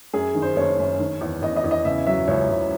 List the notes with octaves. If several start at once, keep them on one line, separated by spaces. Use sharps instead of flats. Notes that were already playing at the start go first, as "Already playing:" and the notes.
F#2 G#4
D#3
C5
F#1 C#5
F#2
D#3
E2
E2 D#5
D#5
E2
D#5
C#3 E5
F#3 E5
C#2 C#5
C#2